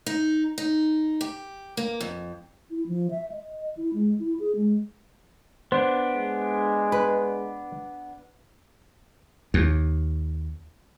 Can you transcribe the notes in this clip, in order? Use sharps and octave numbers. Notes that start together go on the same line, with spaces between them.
D#4
D#4
G4
A#3
F2
E4
F3
E5
D#5
E4
G#3
E4
G#4
G#3
B3 D4 C5
G#3
B4
D#2